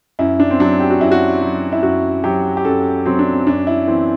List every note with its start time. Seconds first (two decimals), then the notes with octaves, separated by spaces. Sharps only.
0.19 F#2 E4
0.40 D4
0.50 C4
0.60 F#3 D4
0.80 G4
0.90 F#4
1.01 F#2 E4
1.12 F#4
1.42 F#3
1.73 E4
1.83 F#2 F#4
2.24 F#3 G4
2.57 G4
2.65 F#2 A4
3.06 F#3 C4
3.19 D4
3.32 C4
3.47 F#2 D4
3.67 E4
3.87 E3 C4